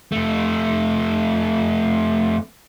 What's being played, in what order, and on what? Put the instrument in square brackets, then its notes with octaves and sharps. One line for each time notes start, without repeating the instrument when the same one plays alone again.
[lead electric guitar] F2 A3